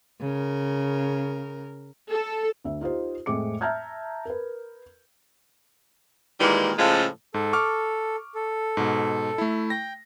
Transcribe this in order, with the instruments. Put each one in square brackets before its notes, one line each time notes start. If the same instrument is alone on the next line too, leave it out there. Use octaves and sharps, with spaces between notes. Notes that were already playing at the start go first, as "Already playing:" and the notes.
[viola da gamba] C#3 A#4
[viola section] A4
[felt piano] D2 E5
D#4 F4 G4 C5
F2 A2 G#3 C4 D6 C#7
E5 A5 A#5 F6 G6 G#6
A#4 B4
[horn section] A#2 D#3 E3 G3 G#3 A#3
A2 C#3 F3 G#3 F4 A4
[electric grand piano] G#2 [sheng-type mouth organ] A4
[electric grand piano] C#6 D6 F6
[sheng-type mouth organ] A4
[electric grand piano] G#2 B2
A3 E4
[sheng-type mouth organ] G5 [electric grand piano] A#6